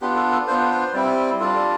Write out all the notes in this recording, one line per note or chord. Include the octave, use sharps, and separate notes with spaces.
B3 D4 F4 G4
A4
A4
B3 D4 F4 C5
C5
G3 C4 E4
G3 D4 F4 A4